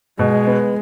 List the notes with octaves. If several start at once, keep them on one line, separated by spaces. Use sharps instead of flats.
B2 G#3
B3